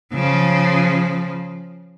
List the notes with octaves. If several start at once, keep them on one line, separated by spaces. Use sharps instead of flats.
C#3 F3